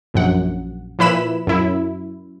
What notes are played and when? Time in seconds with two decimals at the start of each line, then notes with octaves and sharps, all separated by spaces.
0.14 A#1 F#2 F#5
0.99 A#2 F3 E4 B4 B5 E7
1.47 F#2 E4